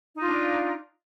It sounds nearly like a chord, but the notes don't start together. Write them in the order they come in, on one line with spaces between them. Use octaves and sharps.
D#4 F4 D4